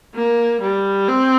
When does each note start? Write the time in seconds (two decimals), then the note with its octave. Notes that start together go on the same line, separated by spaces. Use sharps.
0.15 A#3
0.62 G3
1.08 C4